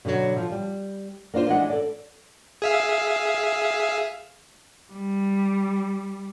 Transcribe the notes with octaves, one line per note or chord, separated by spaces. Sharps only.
B2 D3 F3 F#3
F3
G3
A#3 D4 F4 C5
E3 G#3 D4 D#5 F#5
A4 D5
G#4 E5 F5
G3